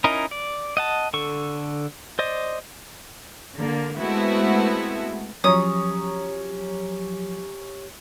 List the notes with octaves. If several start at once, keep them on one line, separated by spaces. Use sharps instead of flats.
C#4 D#4 E4 A#4 D#5
D5
D#5 F#5 A5
D3 A4 C#6
C5 D5 D#5
D3 A#3
G#3 A3 B3 C4 E4 F#4
F3 F#3 C#4 G4 C#5 A#5 D#6